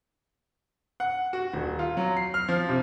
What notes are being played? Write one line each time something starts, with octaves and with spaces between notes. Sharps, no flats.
F#5
F#4
D#1
F4
F#3
C7
F6
F3
C3